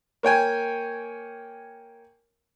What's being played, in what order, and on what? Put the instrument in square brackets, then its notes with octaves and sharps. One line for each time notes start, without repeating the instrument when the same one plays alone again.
[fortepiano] A#3 C#5 G5 G#5